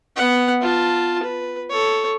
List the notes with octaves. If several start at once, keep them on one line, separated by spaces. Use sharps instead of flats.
B3 F#5
F4 A5
B4
A4 C#5